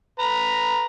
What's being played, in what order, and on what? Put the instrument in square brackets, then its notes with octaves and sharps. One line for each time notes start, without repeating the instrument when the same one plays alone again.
[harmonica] B4 A#5